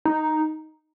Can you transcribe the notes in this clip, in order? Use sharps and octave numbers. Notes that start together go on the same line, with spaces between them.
D#4